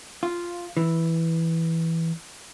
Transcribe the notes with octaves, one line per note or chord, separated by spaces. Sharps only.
F4
E3